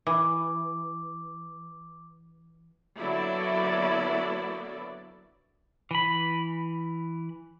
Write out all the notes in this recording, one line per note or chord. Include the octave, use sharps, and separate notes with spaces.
E3 D6
D3 F#3 A#3 B3 E4 D5
E3 B5